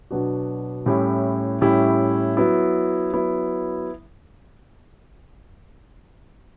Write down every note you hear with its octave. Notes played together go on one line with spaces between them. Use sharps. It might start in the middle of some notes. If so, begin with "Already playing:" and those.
B2 F#3 B3 D4 F#4
A2 G3 C#4 E4 G4
A2 G3 C#4 E4 G4
F#3 B3 E4
F#3 B3 E4